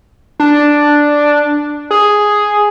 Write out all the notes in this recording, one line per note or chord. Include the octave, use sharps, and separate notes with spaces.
D4
G#4